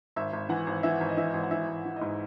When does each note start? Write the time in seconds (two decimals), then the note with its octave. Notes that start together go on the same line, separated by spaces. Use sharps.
0.16 G#1 E5
0.33 G#1
0.49 E3 F#5
0.67 G#1
0.83 E3 E5
1.01 G#1
1.09 D#5
1.17 E3 E5
1.34 G#1
1.43 F#5
1.51 E3 E5
1.68 G#1
1.85 E3
1.96 D#5
2.01 G#2